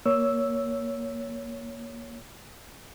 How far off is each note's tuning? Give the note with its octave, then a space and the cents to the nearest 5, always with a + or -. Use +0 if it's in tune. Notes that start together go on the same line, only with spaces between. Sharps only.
A#3 +10 C#5 +15 E6 +0